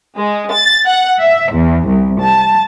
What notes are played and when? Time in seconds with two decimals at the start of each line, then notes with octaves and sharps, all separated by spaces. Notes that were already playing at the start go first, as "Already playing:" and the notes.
0.17 G#3
0.51 A6
0.86 F#5
1.20 E5
1.54 E2
1.88 C2
2.21 A5